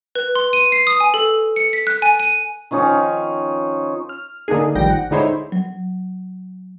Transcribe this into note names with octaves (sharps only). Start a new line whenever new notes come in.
B4
C6
D#7
C7
D#6
G#5
A4
C#7
B6
F#6
G#5
D#7
D#3 F3 C#4 D#4
F6
D3 A#3 D4 D#4 G#4
A1 D#3 F3 G3 G5 A#6
F#5
D3 G#3 D#4 E4 C5 C#5
F#3